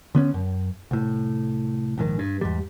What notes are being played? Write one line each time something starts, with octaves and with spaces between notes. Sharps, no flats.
D3 B3 C#4
F#2
C2 A2
A#1 G#2 D#3
G2
E2 G#2 G3